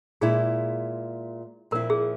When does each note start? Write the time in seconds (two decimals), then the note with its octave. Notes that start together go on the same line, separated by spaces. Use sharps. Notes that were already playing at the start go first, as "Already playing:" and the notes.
0.21 A#2 G#3 E4 G#4
1.71 A#2 F3 C4 E4 A#4
1.90 G#4